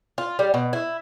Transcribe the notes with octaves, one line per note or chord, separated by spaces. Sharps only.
F4
G3
B2
E4